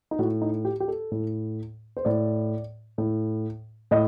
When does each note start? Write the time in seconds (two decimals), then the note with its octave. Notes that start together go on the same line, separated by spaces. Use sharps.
0.11 D#4
0.19 A2 F#4
0.42 D#4
0.65 G4
0.80 G4
0.88 A4
1.11 A2
1.97 C5
2.05 A2 D5
2.98 A2
3.91 A2 D#5